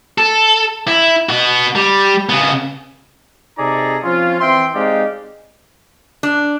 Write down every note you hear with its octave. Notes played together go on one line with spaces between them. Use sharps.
A4
E4
B3 F#4
G3
C#3 B3
C3 D#4 G#4 A4 D5 A#5
F3 C4 C#4 F4
E3 C4 E5 G5 C6
G#3 C4 D#4 G4 D5 F5
D4